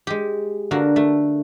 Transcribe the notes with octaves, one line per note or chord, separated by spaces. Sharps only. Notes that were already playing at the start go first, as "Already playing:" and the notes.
G#3 G4
D3 A#3 F#4
A3